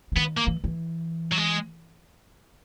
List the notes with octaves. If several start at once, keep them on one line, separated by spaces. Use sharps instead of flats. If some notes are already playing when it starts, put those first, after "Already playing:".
E3
D#3 B3
A#3
E3
E3
F#3
G#3